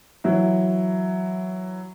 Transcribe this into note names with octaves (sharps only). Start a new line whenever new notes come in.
E3 F#3 E4